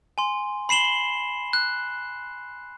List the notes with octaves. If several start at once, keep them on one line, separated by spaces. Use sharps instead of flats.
G#5 C6
B5 C7 E7 F#7 G7
F#6